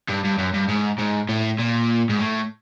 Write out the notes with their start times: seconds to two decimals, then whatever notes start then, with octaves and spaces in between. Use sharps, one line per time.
0.09 G2
0.24 G2
0.38 F#2
0.54 G2
0.69 G#2
0.99 G#2
1.29 A2
1.59 A#2
2.09 G#2
2.20 A2